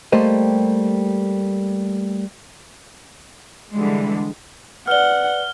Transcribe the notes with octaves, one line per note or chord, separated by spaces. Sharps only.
G3 A3 A#3 G4 C5 D#5
D3 E3 G3 G#3
B4 D5 F#5 F6 G7